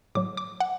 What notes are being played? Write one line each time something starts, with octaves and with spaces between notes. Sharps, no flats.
A2 F#3 D6
D6
F#5